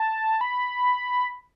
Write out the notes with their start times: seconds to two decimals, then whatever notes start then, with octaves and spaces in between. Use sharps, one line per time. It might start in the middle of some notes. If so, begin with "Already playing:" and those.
Already playing: A5
0.41 B5